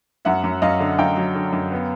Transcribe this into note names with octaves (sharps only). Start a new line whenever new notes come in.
F#2 E5 F#5
F#2
F#2 D#5 F5
D3
F#2 F5 G5
F#3
D3
F#2
B3